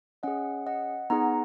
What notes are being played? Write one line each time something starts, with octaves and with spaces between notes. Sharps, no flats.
C#4 G#4 D#5 F#5
D#5 F#5
B3 D#4 G#4 F#5 A#5